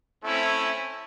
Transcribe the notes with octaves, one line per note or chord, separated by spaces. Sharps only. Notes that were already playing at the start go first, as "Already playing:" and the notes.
A3 C4 C#4 E4